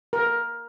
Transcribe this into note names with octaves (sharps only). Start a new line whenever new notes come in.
A#4